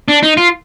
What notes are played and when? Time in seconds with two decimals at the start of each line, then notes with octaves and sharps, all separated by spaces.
0.08 D4
0.23 D#4
0.37 F4